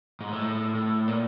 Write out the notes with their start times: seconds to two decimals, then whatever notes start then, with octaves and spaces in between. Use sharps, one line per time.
0.21 G#2
0.32 A2
0.75 A2
1.08 A#2